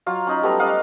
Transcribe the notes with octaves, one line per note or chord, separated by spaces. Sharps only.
F#3 F4 F5
C#4 D#4 B5
G3 A3 B3 A#5
D5 D#5 F5 F#5